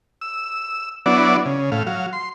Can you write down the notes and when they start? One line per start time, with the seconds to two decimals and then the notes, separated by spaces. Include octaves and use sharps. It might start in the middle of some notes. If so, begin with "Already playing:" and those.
0.21 E6
1.06 F#3 B3 D4 E4 D5
1.45 C#3
1.72 A2 F5
1.87 F#3 F5
2.13 C6